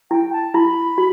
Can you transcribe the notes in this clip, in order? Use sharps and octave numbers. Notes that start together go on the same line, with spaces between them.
E4 G5
A5
E4 B5
F#4